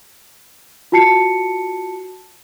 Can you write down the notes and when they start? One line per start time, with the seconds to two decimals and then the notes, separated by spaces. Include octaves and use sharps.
0.92 F4 F#4 A5 C7 C#7